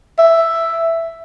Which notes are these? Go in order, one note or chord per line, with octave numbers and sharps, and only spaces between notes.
E5